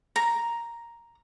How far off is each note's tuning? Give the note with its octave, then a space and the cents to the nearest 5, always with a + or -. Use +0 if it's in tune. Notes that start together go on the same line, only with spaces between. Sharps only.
A#5 +5